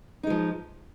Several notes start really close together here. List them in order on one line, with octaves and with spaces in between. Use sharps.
D#4 G#3 F3